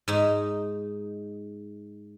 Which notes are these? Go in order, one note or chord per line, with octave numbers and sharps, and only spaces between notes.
G#2 D#4